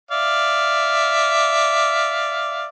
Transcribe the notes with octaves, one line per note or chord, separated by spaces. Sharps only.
D5 E5 F5